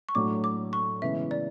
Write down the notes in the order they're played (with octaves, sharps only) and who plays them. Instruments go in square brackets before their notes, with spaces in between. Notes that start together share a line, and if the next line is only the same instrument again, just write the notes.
[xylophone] C#6
[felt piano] A2 F#3 A3 D4 [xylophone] D6
[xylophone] D6
C#6
[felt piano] C#3 E3 G#3 B3 [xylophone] E5
[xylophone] D5